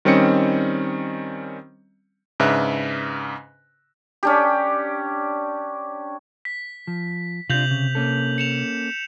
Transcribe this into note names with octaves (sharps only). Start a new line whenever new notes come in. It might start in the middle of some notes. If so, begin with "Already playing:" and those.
D#3 G3 C4 C#4 D#5 C#7
G#2 C#3 D4 B4 E5 F#6
C#4 D4 G4
B6
F3
C3 D4 F4 G6 F7 F#7
C#3
A#3 C#4 A4
C#7 E7 F7